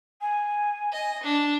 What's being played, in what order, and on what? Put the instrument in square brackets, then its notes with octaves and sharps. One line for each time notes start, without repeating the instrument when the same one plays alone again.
[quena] G#5
[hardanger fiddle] D#5
D4